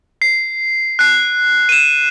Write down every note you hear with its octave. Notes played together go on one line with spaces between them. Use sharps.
C7
F#6 C7
D#7 E7